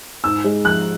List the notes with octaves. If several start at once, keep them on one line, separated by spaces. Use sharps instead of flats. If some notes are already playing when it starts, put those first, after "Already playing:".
G#2 E6
G#3
F3 F#6